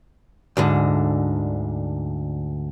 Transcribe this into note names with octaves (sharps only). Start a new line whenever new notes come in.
D2 G#2 D3